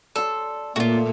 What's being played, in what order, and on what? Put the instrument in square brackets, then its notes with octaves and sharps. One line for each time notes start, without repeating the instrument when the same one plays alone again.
[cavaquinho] A4 [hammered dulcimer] D5 C6
[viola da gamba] A#2 [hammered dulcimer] A3 D5 [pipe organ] A#3 [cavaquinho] F4 F#4